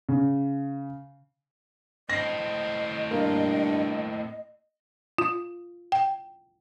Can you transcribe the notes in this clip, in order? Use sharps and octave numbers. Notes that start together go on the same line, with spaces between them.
C#3
A2 C4 D#5 A#6 C7
G2 A#3
F4
G5